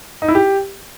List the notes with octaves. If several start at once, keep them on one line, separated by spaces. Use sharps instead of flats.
D#4
E4
G4